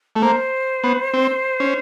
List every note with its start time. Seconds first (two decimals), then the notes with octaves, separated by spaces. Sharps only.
0.16 A3
0.22 A#3 C5
0.84 B3
1.13 C4
1.60 C#4